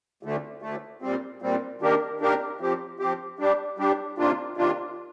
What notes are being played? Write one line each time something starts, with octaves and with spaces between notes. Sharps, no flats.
D2 D3 A3
D2 D3 A3
A#2 G3 C4
A#2 G3 C4
D#3 A#3 D4 G4 A#4
D#3 A#3 D4 G4 A#4
F3 C4 G4
F3 C4 G4
G3 D4 G4
G3 D4 G4
C3 D#3 A#3 D4 F4
C3 D#3 A#3 D4 F4